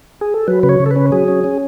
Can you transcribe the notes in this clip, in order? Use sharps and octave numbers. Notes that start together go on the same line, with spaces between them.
G#4
A4
F#3 B4
C#3 B4
C#5
C#3
A4
B4
C#4
F#3 G#4
C#4
C#4